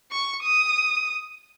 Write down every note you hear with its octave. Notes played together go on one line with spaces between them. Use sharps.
C#6
D#6